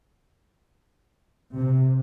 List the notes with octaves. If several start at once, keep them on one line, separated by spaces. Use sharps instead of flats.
C3